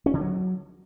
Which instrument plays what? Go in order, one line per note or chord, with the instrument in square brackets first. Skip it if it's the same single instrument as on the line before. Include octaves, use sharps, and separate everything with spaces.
[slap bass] C#4
D3
F#3